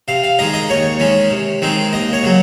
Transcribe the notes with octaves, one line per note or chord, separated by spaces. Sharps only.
C3 F5
F5
D#3 G#3 D#4 D#5
D#5
D#2 C#5
D#3 G#3 C#4
C3
D#3 G#3 C4 D#4
D#2 D#5
C#5
C#3 F#3